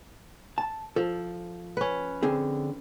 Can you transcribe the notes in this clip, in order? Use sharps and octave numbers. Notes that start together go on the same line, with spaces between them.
A5
F3 A4
C#4 B4
D3 C4 G#4